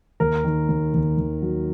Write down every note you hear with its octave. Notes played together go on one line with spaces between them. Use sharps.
D#2 A#4
D#3
D#2
D#2
D#2
F#3